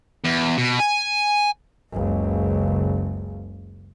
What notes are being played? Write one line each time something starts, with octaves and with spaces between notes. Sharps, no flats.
E2
B2
G#5
F#1 C#2